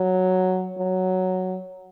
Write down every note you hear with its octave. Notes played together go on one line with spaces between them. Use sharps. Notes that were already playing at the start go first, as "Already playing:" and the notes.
Already playing: F#3
F#3